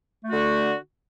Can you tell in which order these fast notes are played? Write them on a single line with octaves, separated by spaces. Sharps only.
A3 F#4 D3